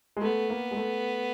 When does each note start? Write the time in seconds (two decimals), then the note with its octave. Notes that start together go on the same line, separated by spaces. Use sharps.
0.17 G#3
0.22 A3 B3
0.50 A#3
0.71 G#3
0.77 A3